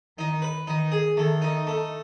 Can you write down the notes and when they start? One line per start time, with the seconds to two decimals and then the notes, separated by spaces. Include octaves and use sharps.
0.17 D#3 D#4
0.42 B4
0.67 D#3 D#4
0.92 G#4
1.17 D#3 A3
1.42 D#4
1.67 A3